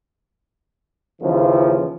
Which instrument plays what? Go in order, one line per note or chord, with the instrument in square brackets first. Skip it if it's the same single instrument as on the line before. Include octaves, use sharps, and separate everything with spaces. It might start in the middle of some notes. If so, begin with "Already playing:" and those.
[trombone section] D#2 C#3 E3 F3